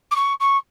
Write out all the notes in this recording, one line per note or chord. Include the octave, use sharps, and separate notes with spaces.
D6
C#6
C#6